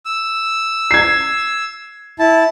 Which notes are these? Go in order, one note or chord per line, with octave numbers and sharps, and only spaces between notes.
E6
G#6 C7
E4 A5